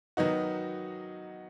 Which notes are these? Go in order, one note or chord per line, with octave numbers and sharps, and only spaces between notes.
D#3 F#3 B3 D#4 F#4